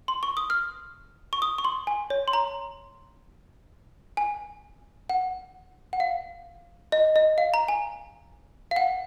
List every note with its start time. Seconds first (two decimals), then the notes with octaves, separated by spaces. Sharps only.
0.08 C6
0.23 C#6
0.37 D#6
0.50 F6
1.33 C#6
1.42 D#6
1.58 C#6
1.65 C6
1.87 G#5
2.10 C#5
2.28 C6
2.33 A#5
4.17 G#5
5.09 F#5
5.93 F#5
6.00 F5
6.92 D#5
7.16 D#5
7.38 F5
7.54 A#5
7.68 G#5
8.71 F5
8.76 F#5